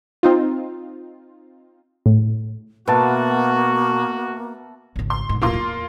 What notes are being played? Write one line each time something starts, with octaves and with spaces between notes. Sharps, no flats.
C4 D#4 F4
A2
B2 A#3 F#4 B4 E5 A5
G#1 C#2
C6
A#1 G#2
D1 A2 A#3 F4 C6
E2